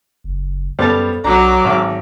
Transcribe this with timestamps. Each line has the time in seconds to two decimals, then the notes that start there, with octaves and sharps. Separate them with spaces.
0.24 F#1
0.79 F#2 G3 B3 A4 C5 F5 A5
1.24 B1 F#3 D4 C#5 A#5 D6
1.65 G#1 G#2